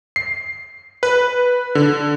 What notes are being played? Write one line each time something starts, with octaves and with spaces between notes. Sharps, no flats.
C7
B4
D3